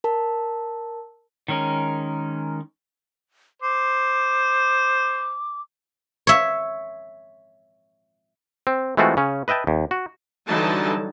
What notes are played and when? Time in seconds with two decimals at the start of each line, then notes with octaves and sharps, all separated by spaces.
0.04 A#4 A5
1.48 D#3 G#3 C#4 A#4
3.62 C5 D6
6.27 C#5 E5
8.67 C4
8.97 E3 G#3 A3 C4 F4 F#4
9.17 C#3 C#4
9.48 B4 D#5 E5 G5 A5
9.67 D#2
9.91 F#4
10.47 D3 E3 F#3 G3 D#4 A5